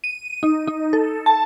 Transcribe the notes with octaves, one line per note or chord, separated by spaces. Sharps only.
D#7
D#4
D#4
A4
A5